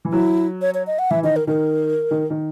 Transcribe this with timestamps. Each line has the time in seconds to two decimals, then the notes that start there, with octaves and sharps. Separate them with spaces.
0.05 E3
0.12 F#3 E4
0.61 C#5
0.74 C#5
0.87 D#5
0.99 F#5
1.11 E3 E5
1.23 D#3 D#5
1.36 A#4
1.47 D#3 A#4
2.11 D#3
2.30 D#3